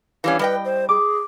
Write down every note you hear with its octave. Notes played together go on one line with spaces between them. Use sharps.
E3 G3 C#4 F5
G3 B4 D#5 G5
C5
G#4 D6